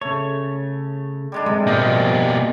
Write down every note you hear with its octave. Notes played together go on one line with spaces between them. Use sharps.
C#3 A3 C#5
G3 G#3 D4
G2 C3 G#3
B2 F3 G3 A#3 F4 C5 D#5 G5